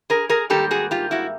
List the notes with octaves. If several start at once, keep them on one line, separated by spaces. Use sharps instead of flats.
G#4 A#4
G#4 A#4
G#2 D#3 G3 A#3 G4 A4
F#4 G#4
F4 G4
E4 F#4